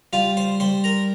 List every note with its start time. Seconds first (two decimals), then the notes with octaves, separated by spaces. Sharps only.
0.13 G3 F4 F5
0.37 C5 C6
0.60 G3 C5 C6
0.84 A#4 A#5